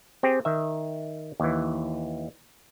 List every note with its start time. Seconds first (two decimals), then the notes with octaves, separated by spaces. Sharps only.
0.23 C4 G4 G#4
0.45 D#3 E5
1.40 D#2 E3